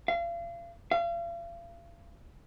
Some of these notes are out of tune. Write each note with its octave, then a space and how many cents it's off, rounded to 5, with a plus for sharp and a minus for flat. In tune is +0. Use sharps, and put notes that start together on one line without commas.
F5 -35
F5 -40